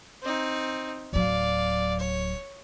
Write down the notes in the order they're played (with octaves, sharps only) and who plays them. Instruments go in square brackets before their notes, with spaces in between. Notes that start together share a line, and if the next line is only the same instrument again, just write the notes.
[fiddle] C4 D#4
[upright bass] D1 F#3 [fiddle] D5 F5
[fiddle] C#5